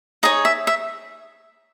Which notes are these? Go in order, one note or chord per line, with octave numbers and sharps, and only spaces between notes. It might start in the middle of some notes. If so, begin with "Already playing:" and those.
D#4 G#4 C#5 D#5
E5
E5